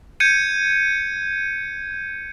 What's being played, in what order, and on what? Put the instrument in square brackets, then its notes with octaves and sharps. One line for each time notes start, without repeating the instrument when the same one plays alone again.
[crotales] G6 G#6 C#7 D#7